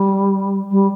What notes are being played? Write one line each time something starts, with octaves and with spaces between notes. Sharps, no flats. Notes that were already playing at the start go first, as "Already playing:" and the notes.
Already playing: G3
G3